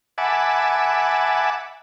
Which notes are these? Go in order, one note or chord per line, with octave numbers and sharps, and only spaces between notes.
E5 F#5 G#5 A5 B5 D6